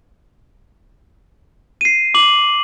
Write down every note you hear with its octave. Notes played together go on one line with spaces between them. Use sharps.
C7 D#7
D6 F#7